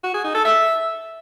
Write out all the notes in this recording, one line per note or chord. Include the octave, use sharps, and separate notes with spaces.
F#4
G#4
D#4
A4
E5